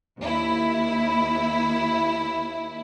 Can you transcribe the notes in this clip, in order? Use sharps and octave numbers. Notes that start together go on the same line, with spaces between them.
D#2 E4